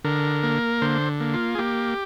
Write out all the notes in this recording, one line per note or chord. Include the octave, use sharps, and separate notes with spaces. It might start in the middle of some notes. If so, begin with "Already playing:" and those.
D3 A#4
A#3
D3 C5
A#3
F4
G#4
A#3 G4